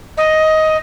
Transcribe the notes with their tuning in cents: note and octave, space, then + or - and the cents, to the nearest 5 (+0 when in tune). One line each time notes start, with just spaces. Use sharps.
D#5 +10